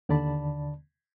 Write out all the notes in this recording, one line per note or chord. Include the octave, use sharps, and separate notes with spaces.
D#2 D3 D5 A5 B5